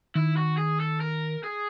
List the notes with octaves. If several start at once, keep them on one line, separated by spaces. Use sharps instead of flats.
D#3 E4
F#4
G#4
A4
A#4
G#4